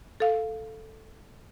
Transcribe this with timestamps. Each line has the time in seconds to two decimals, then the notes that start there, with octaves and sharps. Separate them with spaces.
0.20 A4 F5